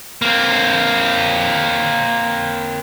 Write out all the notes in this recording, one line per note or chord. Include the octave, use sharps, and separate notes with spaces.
A#3 C4